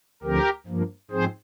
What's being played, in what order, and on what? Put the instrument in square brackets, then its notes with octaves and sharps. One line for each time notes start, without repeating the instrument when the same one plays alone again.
[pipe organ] D2 D3 F3 C4 G4 A#4
G2 F3 A#3
G#2 F3 C4 G#4 C5